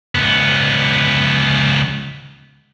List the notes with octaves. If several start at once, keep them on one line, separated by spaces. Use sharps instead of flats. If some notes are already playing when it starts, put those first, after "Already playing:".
C#2 B3